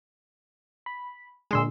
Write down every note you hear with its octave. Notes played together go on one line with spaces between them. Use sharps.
B5
A#2 D3 G#3 G#4 C6 E6